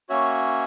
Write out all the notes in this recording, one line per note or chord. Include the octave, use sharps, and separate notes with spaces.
A#3 C#4 F#4 C#5 E5